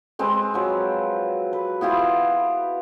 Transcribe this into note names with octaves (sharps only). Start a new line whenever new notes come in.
G#3 C4 B4
F3 F#3
B4
B3 E4 F4 G4